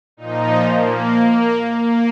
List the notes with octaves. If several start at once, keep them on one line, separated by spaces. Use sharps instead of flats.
A#2 F3 D#4
A#3
A#3